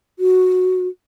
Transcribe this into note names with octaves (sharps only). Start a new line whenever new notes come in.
F#4